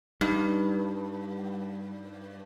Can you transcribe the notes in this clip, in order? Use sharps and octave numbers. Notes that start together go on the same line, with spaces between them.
G2 G3 D#4